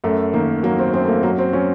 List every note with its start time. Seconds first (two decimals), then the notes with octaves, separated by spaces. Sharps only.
0.04 F#2 A3
0.34 D#3 A#3
0.63 F#3 A#3
0.78 C4
0.93 F#2 C4
1.04 A3
1.08 A#3
1.23 F#3 A#3
1.38 C4
1.53 F#3 C#4